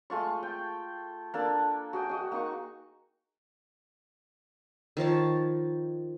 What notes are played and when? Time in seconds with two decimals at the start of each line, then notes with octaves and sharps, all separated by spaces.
0.10 G#3 A3 F4 C#6
0.43 G5
1.34 A#3 D4 A4
1.93 F#4 G#4 G5
2.09 F#4 D#5
2.32 A#3 D#4 C#6
4.97 D#3 F3 C#5 A5